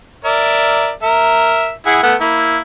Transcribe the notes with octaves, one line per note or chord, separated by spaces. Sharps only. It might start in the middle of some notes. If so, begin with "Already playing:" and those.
A#4 D5 E5
A#4 E5
E4 G#4 F#5
A3 B3 F#5
A#3 E4